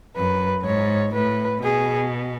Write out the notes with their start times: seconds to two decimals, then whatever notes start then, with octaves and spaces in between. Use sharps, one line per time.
0.16 F#2 B4
0.65 G#2 C#5
1.14 A2 B4
1.62 B2 G#4